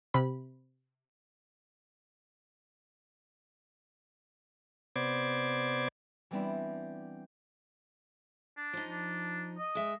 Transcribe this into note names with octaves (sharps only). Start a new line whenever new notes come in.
C3 B5
C3 B3 C5 D5 D6 G#6
E3 G3 B3 C4 D4 E4
D4
F3 D#4
D4
D#5
G#3 E5